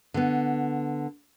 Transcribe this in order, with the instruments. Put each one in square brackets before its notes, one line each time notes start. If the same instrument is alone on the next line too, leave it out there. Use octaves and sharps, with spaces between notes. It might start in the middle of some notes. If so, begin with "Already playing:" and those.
[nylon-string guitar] D3 B3